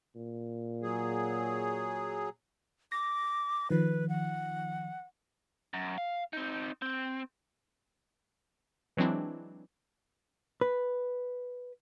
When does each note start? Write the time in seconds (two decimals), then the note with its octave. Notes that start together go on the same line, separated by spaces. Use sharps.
0.16 A#2
0.82 F#3 G#4
2.92 D6 A#6
3.71 D#3 F3 B4
4.09 F#5
5.74 F#2
5.98 F5
6.33 C4 D#4
6.82 C4
8.97 E3 F#3 G#3 C4 D4 E4
10.61 B4